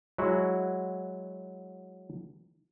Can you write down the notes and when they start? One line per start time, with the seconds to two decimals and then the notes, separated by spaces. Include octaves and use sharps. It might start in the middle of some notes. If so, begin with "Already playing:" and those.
0.18 F#3 G#3 E4 F#4